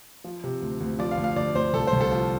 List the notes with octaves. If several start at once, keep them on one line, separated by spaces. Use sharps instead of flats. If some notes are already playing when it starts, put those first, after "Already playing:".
F3
C3
D2
D2
F3 D5
F5
D2
F5
D2 D5
D2 C5
C2 A4
C5
C2
A4
F3